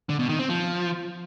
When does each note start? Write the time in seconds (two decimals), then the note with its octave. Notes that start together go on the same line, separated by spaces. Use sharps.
0.09 D3
0.19 B2
0.29 D#3
0.39 C4
0.49 F3